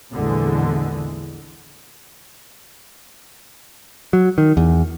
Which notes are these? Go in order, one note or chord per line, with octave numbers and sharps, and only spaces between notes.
A#1 E2 D3 E3 G#3
F#3
D#3
E2